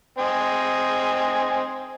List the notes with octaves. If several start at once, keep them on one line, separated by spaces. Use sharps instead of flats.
C4 D#5 G#5